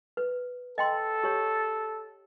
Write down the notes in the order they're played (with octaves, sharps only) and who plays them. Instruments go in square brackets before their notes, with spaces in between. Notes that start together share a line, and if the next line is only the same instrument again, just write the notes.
[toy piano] B4
[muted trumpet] A4 [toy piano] D#5 G5 C6
[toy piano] G4 C#5